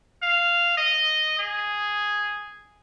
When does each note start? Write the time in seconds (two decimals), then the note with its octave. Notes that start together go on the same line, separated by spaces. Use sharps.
0.22 F5
0.77 D#5
1.39 G#4